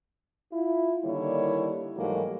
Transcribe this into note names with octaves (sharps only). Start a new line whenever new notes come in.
E4 F4
D3 D#3 G3 A#3 E4 C#5
G#2 E3 F#3 G3 A3 A#3